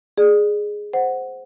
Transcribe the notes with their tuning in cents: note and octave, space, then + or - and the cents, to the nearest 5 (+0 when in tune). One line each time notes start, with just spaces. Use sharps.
G#4 +0 D5 +30
C5 +0 F#5 +0